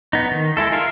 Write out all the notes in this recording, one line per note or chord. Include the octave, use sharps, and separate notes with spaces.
B3 D#4
D#3
G#3 E4 A4
F4 A#4 E5 F5